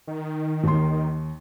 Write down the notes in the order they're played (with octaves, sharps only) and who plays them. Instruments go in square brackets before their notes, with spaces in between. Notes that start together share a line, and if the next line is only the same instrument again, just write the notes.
[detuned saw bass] D#3
[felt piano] D#2 C6